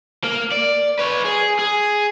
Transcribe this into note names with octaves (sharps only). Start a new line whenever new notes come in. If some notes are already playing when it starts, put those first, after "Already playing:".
A#3
D5
B4 C#5
G#4
G#4